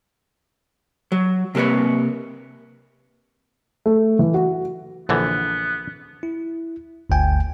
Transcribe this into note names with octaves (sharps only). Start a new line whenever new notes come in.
F#3
C3 A#3 A4 B4 C#5
A3
E3
F#4
A#1 D3 E3 B3
E4
G1 D2 G5 G#5